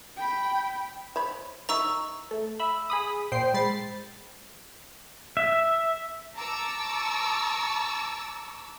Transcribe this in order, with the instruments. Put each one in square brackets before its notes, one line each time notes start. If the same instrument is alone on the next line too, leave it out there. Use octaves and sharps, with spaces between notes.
[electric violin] G5 B5
[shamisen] C5 C#5 B5
[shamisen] D#3 F#3 E4 [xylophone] A#5 C#6 E6
[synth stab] A3
E5 B5
G#4 B5 D#6
A#2 C5 G5 C7
G#2 B5 A6 C7
[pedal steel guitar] E5
[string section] A5 A#5 C#6 D6 E6